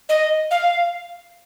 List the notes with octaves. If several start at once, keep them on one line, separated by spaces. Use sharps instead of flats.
D#5
F5